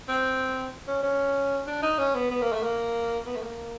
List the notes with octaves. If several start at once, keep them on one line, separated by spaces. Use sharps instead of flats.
C4
C#4
C#4
D4
D#4
C#4
B3
B3
A#3
A3
A#3
B3
A3
A#3